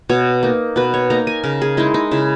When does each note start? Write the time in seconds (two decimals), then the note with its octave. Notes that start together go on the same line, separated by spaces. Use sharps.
0.09 B2 C#5
0.43 A#3 D#4
0.76 B2 B4
0.94 C#5
1.10 A#3 D#4 A#5
1.27 G#5
1.44 C#3 A#4
1.62 G#4
1.77 G#3 D#4 E4
1.94 D#4
2.11 C#3 E4